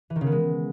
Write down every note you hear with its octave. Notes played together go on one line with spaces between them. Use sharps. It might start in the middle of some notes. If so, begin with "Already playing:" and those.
E3
D#3
C#3
B3
G#3